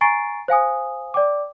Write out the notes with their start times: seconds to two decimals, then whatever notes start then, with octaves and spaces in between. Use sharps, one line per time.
0.01 G#5 A#5 C#6 A6 C7 D7
0.48 C5 F5 G#5 D#6
1.14 D5 G5 D6